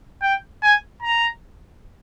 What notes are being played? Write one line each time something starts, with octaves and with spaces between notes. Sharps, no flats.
G5
G#5
A#5